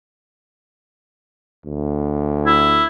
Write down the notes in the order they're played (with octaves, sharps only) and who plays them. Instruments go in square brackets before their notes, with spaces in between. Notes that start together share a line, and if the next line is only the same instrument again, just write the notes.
[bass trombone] D2
[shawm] E4